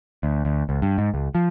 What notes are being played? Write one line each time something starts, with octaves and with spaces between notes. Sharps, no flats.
D2
D2
C#2
G2
G#2
C#2
F3